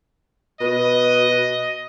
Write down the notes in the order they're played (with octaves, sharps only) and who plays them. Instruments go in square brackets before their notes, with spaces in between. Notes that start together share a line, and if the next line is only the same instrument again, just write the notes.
[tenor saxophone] B2 [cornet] D#5